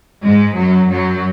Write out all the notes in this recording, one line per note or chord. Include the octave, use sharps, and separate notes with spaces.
G#2 G#3
F#2 F#3
F#2 F#3